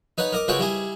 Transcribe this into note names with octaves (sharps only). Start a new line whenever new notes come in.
D#4 B4 C#5 F#5
A#4 D#5 D6
C#2 G#3 F#4 B4 C#5 G5
G3 E4 G#4